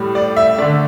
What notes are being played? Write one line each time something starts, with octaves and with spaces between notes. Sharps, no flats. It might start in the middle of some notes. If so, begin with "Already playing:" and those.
Already playing: A2 G3
D5
E5
D3 A3 D5